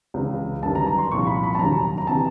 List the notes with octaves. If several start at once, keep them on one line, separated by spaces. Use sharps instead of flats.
C#2 C#3 E3
G1 F#2 D#3 G3 A5
A#5
A#5
C6
C2 A#2 F3 C#6
B5
B5
A5
D#2 D#3 F#3 A#5
A#5
C3 E3 A5